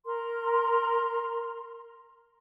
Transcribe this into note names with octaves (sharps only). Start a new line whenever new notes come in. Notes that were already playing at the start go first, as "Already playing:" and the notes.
A#4 A#5 C6